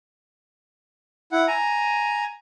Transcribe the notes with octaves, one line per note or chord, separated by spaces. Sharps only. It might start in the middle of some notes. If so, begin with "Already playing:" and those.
E4 F#5
G#5 A#5